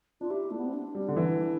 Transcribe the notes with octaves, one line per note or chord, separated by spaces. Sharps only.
D4 F4
E4 G4
A3 D4
B3
C4
D4
G3
D3
E3